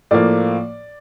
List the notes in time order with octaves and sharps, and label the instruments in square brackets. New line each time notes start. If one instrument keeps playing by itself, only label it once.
[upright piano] A2 F3 A#3 D5